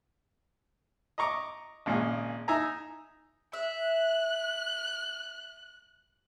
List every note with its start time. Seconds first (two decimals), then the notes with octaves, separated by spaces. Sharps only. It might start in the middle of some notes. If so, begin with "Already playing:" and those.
1.18 D#5 A#5 C#6 D6
1.86 G#1 A#2 C#3 G#4
2.48 D#4 E5 G#5 A#5
3.53 E5 F#6